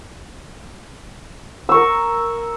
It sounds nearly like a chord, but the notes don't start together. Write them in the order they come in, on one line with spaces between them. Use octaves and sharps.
E6 C#6 A#4